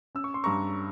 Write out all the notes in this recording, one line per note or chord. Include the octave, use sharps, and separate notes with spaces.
C#4 E6
C#6
C6
G2 A#5 C#6